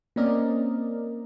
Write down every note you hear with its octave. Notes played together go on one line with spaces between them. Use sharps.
A#3 C4 C#4 A#4 D5 D#5